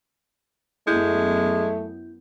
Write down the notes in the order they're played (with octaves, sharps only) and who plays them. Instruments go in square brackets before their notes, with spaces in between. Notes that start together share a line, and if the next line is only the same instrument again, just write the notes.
[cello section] F#2 B3 [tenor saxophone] G#3 [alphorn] A3 [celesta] E4 G6